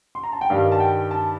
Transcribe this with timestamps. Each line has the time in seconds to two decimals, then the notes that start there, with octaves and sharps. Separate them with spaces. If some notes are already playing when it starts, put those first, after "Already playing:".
0.15 C6
0.24 A#5
0.33 A5
0.41 G5
0.50 G2 D#3 G3 F5
0.72 A5
0.80 G5
1.11 A5